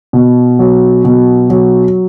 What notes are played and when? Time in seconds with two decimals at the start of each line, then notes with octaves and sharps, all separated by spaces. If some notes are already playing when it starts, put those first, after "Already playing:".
0.13 B2
0.59 F#3
1.05 B2
1.50 F#3